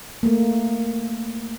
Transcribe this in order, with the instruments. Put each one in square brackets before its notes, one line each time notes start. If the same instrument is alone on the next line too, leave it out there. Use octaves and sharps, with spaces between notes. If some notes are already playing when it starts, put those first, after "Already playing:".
[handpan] A3 A#3